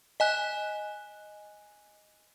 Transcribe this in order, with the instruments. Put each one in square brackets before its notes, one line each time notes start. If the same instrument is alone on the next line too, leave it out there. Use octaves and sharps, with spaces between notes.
[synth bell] D#5 G#5 F#6